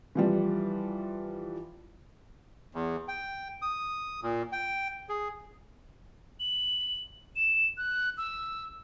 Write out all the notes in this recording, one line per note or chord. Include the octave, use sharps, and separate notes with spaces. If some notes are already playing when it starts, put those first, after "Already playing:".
E3 F3 G3
E2
G5
D#6
A#2
G5
G#4
F#7
E7
F#6
E6